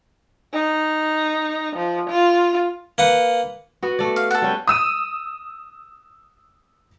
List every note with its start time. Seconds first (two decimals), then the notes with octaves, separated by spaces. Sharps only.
0.53 D#4
1.76 F3
2.10 F4
2.98 A#3 B4 F#5
3.83 B3 F#4
3.99 A3 D5
4.16 F5
4.31 A4 F#5
4.42 G3 C#4 G5
4.67 D#6 E6 D#7